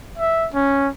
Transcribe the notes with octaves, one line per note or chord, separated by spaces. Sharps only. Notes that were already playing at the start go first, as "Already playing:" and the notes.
E5
C#4